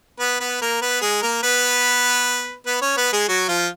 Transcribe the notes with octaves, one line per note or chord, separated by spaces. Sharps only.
B3 B4
B3 B4
A#3 A#4
B3 B4
G#3 G#4
A#3 A#4
B3 B4
B3 B4
C#4 C#5
B3 B4
G#3 G#4
F#3 F#4
F3 F4